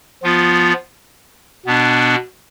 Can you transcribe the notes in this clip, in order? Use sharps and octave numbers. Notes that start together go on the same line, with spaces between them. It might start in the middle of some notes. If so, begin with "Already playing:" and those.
F3 B3 F4
B2 B3 D4